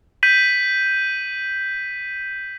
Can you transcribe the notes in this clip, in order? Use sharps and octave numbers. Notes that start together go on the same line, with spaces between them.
G6 B6 D#7 F#7